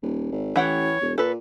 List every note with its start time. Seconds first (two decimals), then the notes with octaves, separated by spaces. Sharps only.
0.02 D#1
0.32 G#1
0.56 A1 E3 C#5 F#5 G5
1.01 E1
1.18 A#2 A4 B4